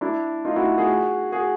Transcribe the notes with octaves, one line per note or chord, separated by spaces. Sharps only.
D4 E4
D#4 F4
E4 F#4
F#4 G#4
F#4 G#4